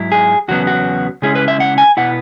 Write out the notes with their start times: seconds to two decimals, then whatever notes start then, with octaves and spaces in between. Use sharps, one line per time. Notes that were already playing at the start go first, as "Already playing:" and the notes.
Already playing: G#2 F#3 E4
0.12 G#4
0.48 E2 C#3 F#3 B3 F#4
0.67 F#4
1.22 C#3 G#3 C#4 E4 G#4
1.35 B4
1.48 E5
1.60 F#5
1.78 G#5
1.97 B2 B3 E4 F#5